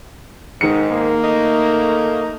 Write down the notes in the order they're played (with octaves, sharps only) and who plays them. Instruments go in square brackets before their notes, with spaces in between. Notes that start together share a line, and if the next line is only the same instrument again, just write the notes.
[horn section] G#2 [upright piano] D#3 C#7
[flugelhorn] A#3
[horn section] A3 D#4